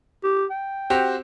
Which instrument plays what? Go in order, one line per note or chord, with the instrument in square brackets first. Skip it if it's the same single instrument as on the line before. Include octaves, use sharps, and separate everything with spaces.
[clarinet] G4
G5
[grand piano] C4 F#4 G4